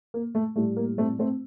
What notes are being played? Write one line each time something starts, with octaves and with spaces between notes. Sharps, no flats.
A#3
A3
A2 G3 A3
A#3
A3 C4
A3 C4